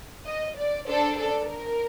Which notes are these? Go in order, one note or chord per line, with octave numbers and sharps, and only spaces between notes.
D#5
D5
D4 A4 C5
A4
A#4